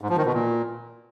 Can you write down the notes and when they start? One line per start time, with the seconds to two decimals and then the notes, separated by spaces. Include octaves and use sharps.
0.01 G#2
0.09 F3
0.17 D#3
0.25 B2
0.33 A#2